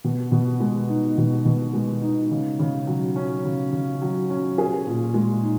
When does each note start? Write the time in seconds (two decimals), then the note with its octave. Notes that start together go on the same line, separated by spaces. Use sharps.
0.04 B2
0.32 B2
0.60 G#3
0.89 D#4
1.18 B2
1.45 B2
1.73 G#3
2.02 D#4
2.31 C#3
2.59 C#3
2.87 F#3
3.16 C#4
3.45 C#3
3.73 C#3
4.02 F#3
4.30 C#4
4.58 G#4
4.87 A#2
5.14 G#3
5.43 D#4